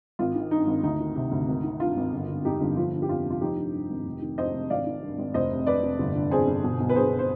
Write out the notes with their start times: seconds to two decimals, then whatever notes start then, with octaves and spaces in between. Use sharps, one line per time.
0.19 G#1 F4
0.35 D#3
0.51 G2 D#4
0.67 G#1
0.83 D2 D#4
1.00 D#3
1.15 C3
1.32 D2
1.48 G#1
1.64 D#3
1.80 G2 F4
1.97 G#1
2.13 G1
2.28 D3
2.45 F2 D#4 G4
2.61 G1
2.77 F3 F4
2.93 D3
3.02 G4
3.09 F2 F4
3.25 F1
3.30 F4
3.41 F3 D#4 G4
3.57 D3
3.73 G2
3.90 G#1
4.05 F1
4.22 D#3
4.38 F2 C5 D#5
4.54 F1
4.70 G#1 D5 F5
4.86 D#3
5.02 G2
5.18 G#1
5.34 F1 C5 D#5
5.50 C3
5.67 F2 B4 D5
5.83 F1
5.99 G1
6.15 D3
6.31 F2 G#4 C5
6.47 G1
6.64 B2
6.80 B1
6.89 B4
6.96 B2 G#4 C5
7.19 C5